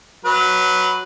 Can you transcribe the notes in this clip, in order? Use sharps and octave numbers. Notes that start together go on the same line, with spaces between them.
F#3 B4